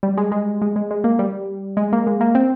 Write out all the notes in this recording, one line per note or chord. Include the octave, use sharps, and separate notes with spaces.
G3
G#3
G#3
G#3
G#3
G#3
A#3
G3
G#3
A#3
G#3
A#3
C4